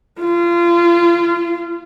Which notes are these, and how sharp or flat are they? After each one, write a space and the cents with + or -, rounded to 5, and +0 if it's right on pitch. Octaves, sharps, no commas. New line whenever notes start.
F4 -30